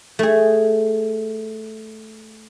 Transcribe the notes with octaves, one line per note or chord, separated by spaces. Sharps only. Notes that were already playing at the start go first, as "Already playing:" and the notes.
A3 G#4